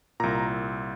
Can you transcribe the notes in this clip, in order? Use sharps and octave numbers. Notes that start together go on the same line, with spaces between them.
C2 A#2 A#5